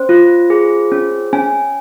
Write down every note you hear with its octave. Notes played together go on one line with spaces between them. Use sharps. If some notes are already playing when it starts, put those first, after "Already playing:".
Already playing: C#4 C5
F4
G#4
C#4
C#4 G#5